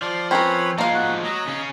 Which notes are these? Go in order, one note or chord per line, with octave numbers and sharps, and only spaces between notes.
F3 D5 C6
C4 C#4 A#4 B4 C#5 B5
F3 G#3 A#3 F5
F#4
F#3 D#5 A#5
C#3 C#4